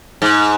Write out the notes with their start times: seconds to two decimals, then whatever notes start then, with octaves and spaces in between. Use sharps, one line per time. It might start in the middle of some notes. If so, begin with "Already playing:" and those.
0.22 G#2